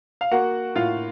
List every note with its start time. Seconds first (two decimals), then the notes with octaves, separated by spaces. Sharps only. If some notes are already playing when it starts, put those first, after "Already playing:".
0.21 F5
0.32 A#3 F#4 F#5
0.76 A2 F4 F5